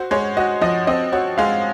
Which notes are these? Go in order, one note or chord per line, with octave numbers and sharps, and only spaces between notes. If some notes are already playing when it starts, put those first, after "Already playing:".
Already playing: F#4 C5
G#3 C#5
F#4 D#5
F3 D#5
C4 D#5
F#4 C#5
G#3 F5